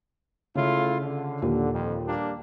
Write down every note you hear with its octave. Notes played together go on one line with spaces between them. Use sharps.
C#3 A3 E4 F4
D3
D#2 A#2
F2
G3 A#3 D4